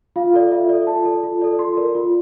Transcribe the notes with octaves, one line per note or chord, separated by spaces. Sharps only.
F4 F5
A4 D5
F4 E5
A4 D5
F4 A5
A4 D5
F4
A4 D5
F4 C6
A#4 D5
F4